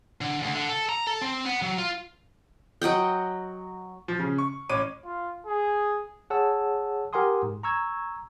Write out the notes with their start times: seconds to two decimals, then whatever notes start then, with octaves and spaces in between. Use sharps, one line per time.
0.21 D3
0.42 D2
0.55 D3
0.69 A4
0.89 A#5
1.07 A4
1.22 C4
1.46 B3
1.62 F#3
1.78 F4
2.82 F#3 D#5 F#5 G5
4.08 F3
4.19 C#3
4.38 C#6
4.69 A1 C#5 D6 D#7
5.05 F4
5.47 G#4
6.30 G#4 C#5 F#5 A5 E6
7.13 G4 A#4 F#5 G#5 C6 D#6
7.43 G#2
7.63 A#5 C#6 E6 G#6